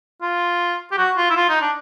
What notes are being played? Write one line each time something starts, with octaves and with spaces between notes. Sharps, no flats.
F4
G4
F#4
F4
E4
F4
D#4
D4